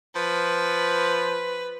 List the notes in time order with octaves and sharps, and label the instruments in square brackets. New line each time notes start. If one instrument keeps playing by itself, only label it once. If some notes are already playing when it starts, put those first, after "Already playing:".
[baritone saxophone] F3 [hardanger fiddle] B4